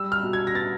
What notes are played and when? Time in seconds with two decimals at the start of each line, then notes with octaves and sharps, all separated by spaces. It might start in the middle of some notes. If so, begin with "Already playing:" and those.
Already playing: G3 E6
0.12 F6
0.23 B2
0.33 G#6
0.47 A#6
0.55 B3 A6